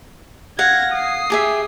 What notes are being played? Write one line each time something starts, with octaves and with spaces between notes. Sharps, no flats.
F5 F#5 G#6 A#6
D#6 C7
G4 G#4 E5